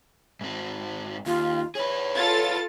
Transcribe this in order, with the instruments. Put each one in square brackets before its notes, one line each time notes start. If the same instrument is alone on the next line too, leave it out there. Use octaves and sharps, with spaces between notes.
[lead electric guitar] G#2 C4
[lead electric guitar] D#2 [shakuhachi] F4
[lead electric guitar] G#4 B4 [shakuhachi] C#5
[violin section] F4 A4 A6